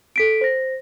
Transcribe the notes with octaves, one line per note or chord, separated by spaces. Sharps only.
A4 B6 D7
C5 A#6